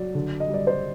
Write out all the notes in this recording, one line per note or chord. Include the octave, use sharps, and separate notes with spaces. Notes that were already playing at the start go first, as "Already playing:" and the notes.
Already playing: F#3 D5
D3
D#5
G3
D5
C5